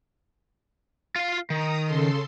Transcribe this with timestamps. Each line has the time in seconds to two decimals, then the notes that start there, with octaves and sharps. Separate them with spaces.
1.16 F4 F5
1.50 D#3 A#5 D#6
1.85 C#3 A4 C6